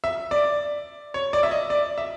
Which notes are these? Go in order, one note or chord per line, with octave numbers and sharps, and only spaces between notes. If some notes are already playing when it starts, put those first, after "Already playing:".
E5
D5
C#5
D5
E5
D#5
D5
E5